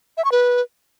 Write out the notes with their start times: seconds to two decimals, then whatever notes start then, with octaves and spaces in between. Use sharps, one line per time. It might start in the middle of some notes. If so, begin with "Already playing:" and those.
0.17 E5
0.25 C#6
0.32 B4